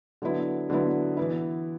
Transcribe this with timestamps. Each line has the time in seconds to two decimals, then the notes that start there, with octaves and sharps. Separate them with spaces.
0.22 D3 F#3 B3 E4
0.70 D3 F#3 B3 E4
1.17 E3 B3 E4